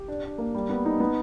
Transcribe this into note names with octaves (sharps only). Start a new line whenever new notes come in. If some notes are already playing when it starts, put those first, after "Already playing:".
Already playing: G4
D4
D4
A#3
G3
B3
D#4
B3